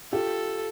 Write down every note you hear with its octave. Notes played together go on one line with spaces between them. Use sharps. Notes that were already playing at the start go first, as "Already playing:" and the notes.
F4 G4 A4